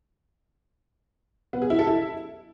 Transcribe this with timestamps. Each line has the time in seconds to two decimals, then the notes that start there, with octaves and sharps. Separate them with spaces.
1.53 B3
1.62 G#4
1.70 E4
1.79 A4
1.87 E4